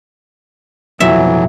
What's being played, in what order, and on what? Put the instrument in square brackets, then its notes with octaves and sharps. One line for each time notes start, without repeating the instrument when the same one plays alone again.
[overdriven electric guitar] B1 F2 [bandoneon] E3 F#3 [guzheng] E5